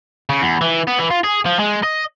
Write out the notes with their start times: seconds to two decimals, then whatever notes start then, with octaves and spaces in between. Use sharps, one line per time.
0.29 C#3
0.42 E2
0.61 E3
0.88 B3
0.99 E3
1.11 F4
1.24 G#4
1.46 F3
1.60 G#3
1.84 D#5